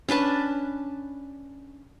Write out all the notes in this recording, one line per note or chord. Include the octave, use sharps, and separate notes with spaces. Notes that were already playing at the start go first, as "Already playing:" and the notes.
C#4 D4 B4 A5